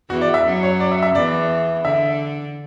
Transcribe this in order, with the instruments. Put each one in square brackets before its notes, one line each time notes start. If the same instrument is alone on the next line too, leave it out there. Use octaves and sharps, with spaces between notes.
[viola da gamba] E2 E3 [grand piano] F#4
[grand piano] D5
E5
[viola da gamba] F#2 F#3
[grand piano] C#5
D5
E5
E5
[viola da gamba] E2 E3 [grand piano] D5
[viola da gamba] D3 [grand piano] E5